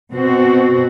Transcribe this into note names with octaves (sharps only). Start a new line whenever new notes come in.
B2 C4 F#4